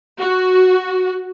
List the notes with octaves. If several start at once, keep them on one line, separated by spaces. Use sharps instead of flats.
F#4